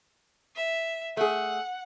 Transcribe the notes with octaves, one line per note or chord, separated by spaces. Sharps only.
E5
A3 G#4 F#5